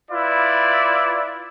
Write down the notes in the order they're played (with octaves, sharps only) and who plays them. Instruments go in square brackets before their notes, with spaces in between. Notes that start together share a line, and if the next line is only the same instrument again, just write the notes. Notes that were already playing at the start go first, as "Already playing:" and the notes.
[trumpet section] E4 F4 B4 D5